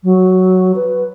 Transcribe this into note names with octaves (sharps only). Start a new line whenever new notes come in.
F#3
B4